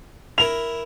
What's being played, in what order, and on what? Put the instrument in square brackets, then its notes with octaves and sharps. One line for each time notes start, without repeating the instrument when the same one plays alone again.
[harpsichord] E4 A#4 [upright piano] F7